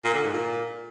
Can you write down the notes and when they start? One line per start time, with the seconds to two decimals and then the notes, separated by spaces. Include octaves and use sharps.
0.04 A#2
0.14 D3
0.24 G#2
0.34 A#2